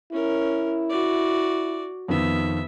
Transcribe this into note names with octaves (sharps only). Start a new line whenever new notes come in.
C#4 E4 A#4
F#4 D5
F2 D#3 B3 E5